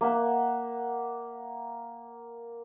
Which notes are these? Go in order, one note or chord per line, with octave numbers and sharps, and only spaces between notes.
A#3 E5 F#5